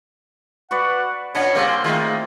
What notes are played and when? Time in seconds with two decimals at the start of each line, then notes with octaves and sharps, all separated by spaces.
0.71 F#4 B4 D5 F#5
1.35 A#2 C#4 D4 C#5 B5
1.55 C#3 G3 A#3 C4 A4
1.68 C6
1.84 D#3 G#3 A3 F4